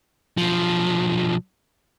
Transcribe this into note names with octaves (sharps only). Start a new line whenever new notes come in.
B1 F3